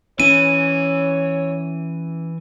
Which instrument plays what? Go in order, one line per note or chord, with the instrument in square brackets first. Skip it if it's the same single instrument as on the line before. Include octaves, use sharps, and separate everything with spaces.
[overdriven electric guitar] E3 [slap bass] C#4 [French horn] C#5 [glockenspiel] D#7